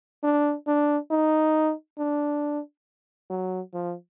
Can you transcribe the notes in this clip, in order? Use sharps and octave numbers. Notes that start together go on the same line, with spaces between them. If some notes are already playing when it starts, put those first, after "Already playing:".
D4
D4
D#4
D4
F#3
F3